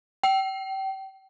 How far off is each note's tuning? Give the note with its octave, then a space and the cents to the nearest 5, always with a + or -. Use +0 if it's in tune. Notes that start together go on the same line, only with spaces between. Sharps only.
G5 -30